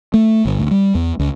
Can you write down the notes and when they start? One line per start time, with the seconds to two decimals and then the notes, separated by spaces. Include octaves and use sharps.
0.14 A3
0.45 G1
0.59 D2
0.71 G3
0.95 E2
1.19 C#2